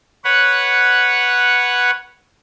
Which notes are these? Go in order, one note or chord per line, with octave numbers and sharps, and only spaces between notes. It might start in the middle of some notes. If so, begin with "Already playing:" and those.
B4 C#5 F#5